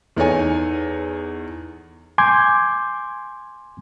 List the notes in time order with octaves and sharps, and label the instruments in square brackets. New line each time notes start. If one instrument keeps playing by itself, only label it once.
[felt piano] E2 D#4 A4 C#5 G#5
[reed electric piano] G#5 C6 D6 G6 G#6